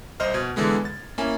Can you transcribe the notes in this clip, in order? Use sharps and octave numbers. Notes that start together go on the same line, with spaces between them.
C2 C5 D#5 F6
B2 G#6
D3 E3 G#3 B3
A6
A#3 C#4 E4 G#5